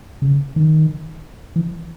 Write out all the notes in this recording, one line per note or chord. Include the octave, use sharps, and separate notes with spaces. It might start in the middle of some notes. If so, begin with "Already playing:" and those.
C#3
D#3
E3